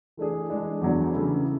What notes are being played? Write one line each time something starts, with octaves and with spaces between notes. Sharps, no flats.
E3 A3 D4 G#4
E3 G#3 D4 G#4
E2 D3 F#3 B3 D4
C#3 E3 A3 E4